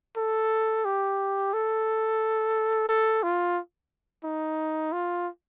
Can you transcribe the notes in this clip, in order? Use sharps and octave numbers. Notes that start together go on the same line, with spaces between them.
A4
G4
A4
A4
F4
D#4
F4